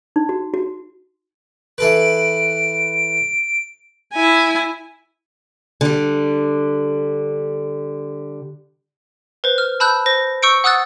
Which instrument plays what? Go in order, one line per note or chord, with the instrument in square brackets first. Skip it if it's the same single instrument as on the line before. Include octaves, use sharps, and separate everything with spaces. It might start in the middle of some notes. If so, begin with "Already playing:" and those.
[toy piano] D#4
F#4
F#4
[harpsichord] E3 A4 B4 [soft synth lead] D7
[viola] E4 G#5
[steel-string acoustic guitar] D3 G3
[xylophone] B4 C5
F6
A5 B5 E6 F#6 G6
C5 A#6
C#6 E6 G6 C#7 D7
F#5 D#6 E6 F#6 A6